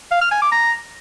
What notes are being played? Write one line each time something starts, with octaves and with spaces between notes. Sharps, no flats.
F5
F6
G#5
D6
A#5